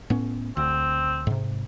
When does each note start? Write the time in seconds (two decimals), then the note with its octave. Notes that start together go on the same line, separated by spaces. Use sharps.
0.10 A2 B3 C#4
0.57 D2 C4
1.27 G#2 C3